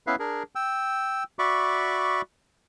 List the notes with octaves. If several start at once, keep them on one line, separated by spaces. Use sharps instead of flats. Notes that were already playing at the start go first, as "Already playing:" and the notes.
B3 C#4 E4 B4 E5 F5
D4 G#4 A#4
G5 E6
F#4 D5 E5 B5 C#6 D6